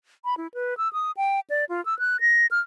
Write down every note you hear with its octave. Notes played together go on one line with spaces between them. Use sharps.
B5
E4
B4
E6
D#6
G5
D5
F4
E6
F#6
A#6
F6